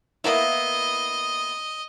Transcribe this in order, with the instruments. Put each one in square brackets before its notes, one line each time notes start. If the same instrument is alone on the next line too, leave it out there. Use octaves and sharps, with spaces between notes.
[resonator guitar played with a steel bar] A#3 B3 E4 [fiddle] D#5